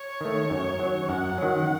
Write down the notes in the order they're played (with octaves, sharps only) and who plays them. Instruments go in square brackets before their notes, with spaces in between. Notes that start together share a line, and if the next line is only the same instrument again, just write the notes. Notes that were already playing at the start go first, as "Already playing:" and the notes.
Already playing: [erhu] C#5
[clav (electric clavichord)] D#3 A3
F#2
D#3 F#3
[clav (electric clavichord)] F#2 [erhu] F#5
[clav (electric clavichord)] D#3 F#3